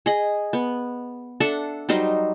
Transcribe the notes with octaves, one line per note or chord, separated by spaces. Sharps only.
G#4 D#5
B3
D4 A4 E5 F#5
F#3 G3 D#4 C5